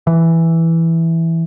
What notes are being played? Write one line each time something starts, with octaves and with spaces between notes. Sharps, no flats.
E3